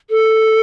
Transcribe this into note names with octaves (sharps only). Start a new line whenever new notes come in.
A4